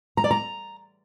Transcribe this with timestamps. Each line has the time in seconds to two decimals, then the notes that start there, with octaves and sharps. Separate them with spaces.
0.17 A#5
0.24 D5
0.31 A#5